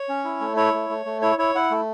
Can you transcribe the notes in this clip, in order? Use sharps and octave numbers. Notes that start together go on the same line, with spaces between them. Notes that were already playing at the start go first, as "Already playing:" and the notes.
Already playing: C#5
C#4
E4
A3
E4 C#5
A3
A3
A3
E4 C#5
E4 C#5
E4 F#5
A3